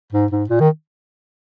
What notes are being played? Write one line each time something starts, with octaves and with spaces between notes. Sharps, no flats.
G#2
G#2
A#2
D#3